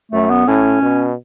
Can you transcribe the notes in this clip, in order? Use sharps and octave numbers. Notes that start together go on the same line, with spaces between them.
F#2 A3
B3
A2 C#4
B2